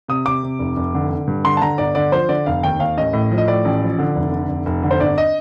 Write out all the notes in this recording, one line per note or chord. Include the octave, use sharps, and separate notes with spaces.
C3 D#6
C3 D6
C3
F1
F1
D3
D3
G2
D3 C6
A5
D3 A#5
G1 D5
D3 D5
F3 C5
D3 D5
F1 F5
D#2 G5
D#2 F5
A1 D#5
A2
F3
D#5
A2 D5
A1
F3
D3
F1
D3
F1
F1
D3
C5
G1 D5
D#5